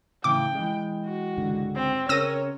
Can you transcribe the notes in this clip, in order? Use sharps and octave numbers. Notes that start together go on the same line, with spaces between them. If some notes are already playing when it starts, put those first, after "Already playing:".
A2 C#3 E3 G5 D6
E3 G#3
F#4
C#2 G#2 D3
C4
C#3 C#4 A#4 C#5 E6 A#6 D#7